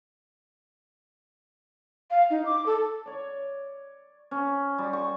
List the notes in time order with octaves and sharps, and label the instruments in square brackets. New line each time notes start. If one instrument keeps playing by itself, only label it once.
[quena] F5
D#4
D6
A4
[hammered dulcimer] C#5 D5
C#4
G3
C#6